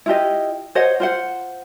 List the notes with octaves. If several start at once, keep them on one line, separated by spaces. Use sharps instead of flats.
E4 F4 G4 D#5
C5 C#5 D#5 F#5
F4 C5 F#5